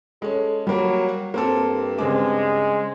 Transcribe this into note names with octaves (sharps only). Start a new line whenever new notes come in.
G#3 C#4 A4
F#3 G3 A#3
G2 A#3 C4 A4
C#3 G#3 C4 D6